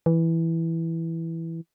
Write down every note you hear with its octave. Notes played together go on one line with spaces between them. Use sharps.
E3